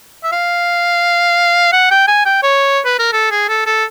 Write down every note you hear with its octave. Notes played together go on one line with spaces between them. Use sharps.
E5
F5
F#5
G5
G#5
G5
C#5
B4
A#4
A4
G#4
A4
A4